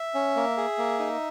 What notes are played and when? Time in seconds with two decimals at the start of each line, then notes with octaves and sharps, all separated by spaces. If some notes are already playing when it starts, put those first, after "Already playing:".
Already playing: E5
0.15 C#4
0.36 A#3
0.57 G#4
0.78 A#3
1.00 D#4